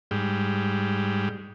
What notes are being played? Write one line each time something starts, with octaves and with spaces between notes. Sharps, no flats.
G#2 G3